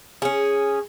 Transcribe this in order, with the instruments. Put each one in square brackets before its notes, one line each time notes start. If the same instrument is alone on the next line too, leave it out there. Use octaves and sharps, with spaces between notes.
[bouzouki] C#4 G#4